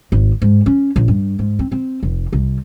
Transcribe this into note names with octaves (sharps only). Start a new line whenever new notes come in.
G#1
G#2
C#4
A#1
G2
G#2
C4
C4
F1
C2